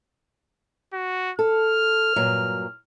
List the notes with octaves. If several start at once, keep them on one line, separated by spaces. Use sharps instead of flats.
F#4
A4 F6
G2 A#2 F#3